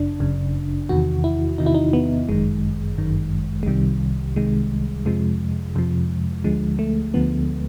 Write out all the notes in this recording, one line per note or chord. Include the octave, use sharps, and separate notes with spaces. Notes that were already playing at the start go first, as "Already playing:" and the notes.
Already playing: G1 F#2 C#3 D4
G1 F#2 C#3
E2 C3 D#3 F#4
E4
E2 C3 D#3 D#4
E4
D#4
B3
G1 F#2 D#3 G#3
G1 F#2 D#3
G#3
C2 C3 D#3 G3
C2 C3 D#3 G#3
F2 C3 F3 G#3
F2 C3 F3
D2 D3 F3 G#3
A3
D2 D3 F3 B3